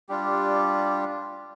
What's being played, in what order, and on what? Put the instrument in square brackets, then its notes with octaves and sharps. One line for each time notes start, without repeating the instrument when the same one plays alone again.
[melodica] G3 D4 F4 G4